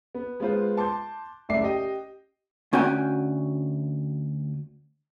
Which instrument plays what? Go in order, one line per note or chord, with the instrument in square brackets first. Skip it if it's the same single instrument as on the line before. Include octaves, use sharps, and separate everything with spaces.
[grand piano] B3
G#3 B3 F4 C5
A5 C6 D6 G6
F#1 A3 D5 E5 D6 C7
G4 D#5 G5
[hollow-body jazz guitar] D2 C#4 F#4 G5 G#5